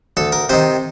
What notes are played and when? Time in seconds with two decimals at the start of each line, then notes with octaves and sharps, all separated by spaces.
0.17 D2 A4
0.32 A#4
0.49 C3 D#3 C5